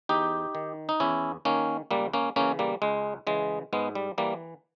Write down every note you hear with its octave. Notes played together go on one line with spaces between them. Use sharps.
E2 D#4 G4
D#3
D#4
E2 C#4 E4
D#3 A#3 C#4
C#2 G3 A#3
A#3 C#4
C#3 E3 A#3 C#4
G3 A#3
C#2 G#3
C#3 E3 G#3
G#2 G#3 B3
G3
E3 G3 A#3